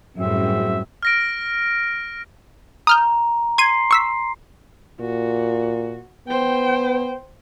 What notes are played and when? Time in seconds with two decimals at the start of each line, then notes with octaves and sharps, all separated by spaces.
0.19 F#2 A2 G3 C4 F#4 G#4 E5
1.03 F6 A#6 D7
2.87 A#5 D#6 F6 G6
3.58 C6 G#6 C7 D#7
3.91 C#6 E6 B6
5.00 A#2 F#4
6.28 B3 C5 G5